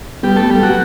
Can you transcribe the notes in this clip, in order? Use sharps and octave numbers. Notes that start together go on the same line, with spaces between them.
G3 B3 G4
A3 B3 A4
G3 G4
F#3 B3 F#4